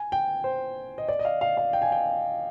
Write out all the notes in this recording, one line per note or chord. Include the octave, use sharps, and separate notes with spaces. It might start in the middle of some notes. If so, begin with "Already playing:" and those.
Already playing: G#5
G5
C5
D#5
D5
D#5
F5
F5
F5
G5
G#5
G5